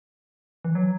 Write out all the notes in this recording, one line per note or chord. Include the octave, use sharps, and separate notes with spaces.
E3
F#3